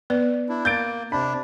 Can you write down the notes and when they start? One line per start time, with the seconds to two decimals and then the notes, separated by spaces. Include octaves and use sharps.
0.10 B3 B4 D5
0.49 D4 E4
0.65 A#3 G6 A6 D7
1.12 C3 D4 B5